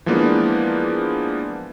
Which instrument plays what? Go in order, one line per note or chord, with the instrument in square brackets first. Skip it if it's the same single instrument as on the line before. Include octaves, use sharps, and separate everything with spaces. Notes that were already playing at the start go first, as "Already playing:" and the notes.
[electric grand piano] E3 F3 G#3 A#3 B3 D4